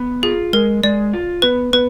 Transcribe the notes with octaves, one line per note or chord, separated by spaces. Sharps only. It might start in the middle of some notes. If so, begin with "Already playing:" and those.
Already playing: B3
F4 G#4
G#3 A#4
G#3 D5
F4
B3 B4
B3 B4